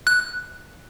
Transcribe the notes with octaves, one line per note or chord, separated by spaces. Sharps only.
F#6